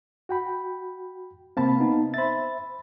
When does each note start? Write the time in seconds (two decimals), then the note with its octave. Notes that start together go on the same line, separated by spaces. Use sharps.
0.29 F#4 G5 B5
1.57 C3 A#3 C4 F5 A5 B5
1.78 B3 D#4
2.14 C5 E5 B5 A6